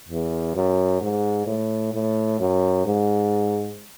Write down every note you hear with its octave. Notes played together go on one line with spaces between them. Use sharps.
E2
F#2
G#2
A2
A2
F#2
G#2